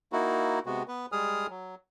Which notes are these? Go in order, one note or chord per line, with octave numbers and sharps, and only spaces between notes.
A#3 D#4 E4 F#4
C3 G#3 B3 F#4
B3 B4
G3 G#3 G#4 D#6 F6
F#3